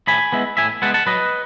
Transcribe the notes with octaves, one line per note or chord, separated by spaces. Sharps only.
A2 G#5 B5
G#3 B3 E4
A2 E5 G#5
G#3 B3 E4 F#5 A5
F#5 A5
F#3 B4 D#5